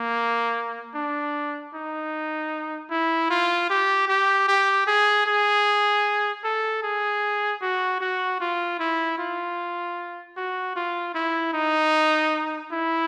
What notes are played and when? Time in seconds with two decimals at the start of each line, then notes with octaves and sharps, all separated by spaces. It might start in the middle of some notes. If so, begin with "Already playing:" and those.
Already playing: A#3
0.95 D4
1.74 D#4
2.91 E4
3.30 F4
3.70 G4
4.08 G4
4.48 G4
4.87 G#4
5.26 G#4
6.44 A4
6.83 G#4
7.62 F#4
8.01 F#4
8.41 F4
8.80 E4
9.18 F4
10.37 F#4
10.76 F4
11.15 E4
11.54 D#4
12.72 E4